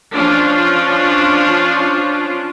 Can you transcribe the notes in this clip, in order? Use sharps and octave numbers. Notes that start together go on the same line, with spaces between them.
F3 C#4 D4 F4